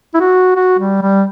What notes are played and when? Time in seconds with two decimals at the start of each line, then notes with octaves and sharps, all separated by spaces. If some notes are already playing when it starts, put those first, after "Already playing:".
0.14 E4
0.21 F#4
0.56 F#4
0.79 G3
1.02 G3